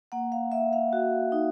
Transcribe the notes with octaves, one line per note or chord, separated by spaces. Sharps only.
A#3 F#5
F5
A#3 E5
F5
F#4
D#4